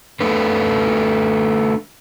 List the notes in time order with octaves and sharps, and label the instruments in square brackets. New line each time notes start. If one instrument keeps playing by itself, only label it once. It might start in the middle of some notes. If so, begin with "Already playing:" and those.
[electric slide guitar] A3 D4 B4